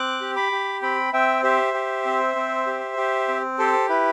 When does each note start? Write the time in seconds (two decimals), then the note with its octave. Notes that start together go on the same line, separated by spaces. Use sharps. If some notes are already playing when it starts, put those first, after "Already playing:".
Already playing: C4 D6 F#6
0.21 G4
0.36 B5 D6
0.52 G4
0.82 C4 G5 B5
1.13 C4 E5 G5
1.43 G4 C5 E5
1.74 G4
2.05 C4
2.35 C4
2.67 G4
2.97 G4
3.28 C4
3.58 G4 A4 C5
3.89 E4 B4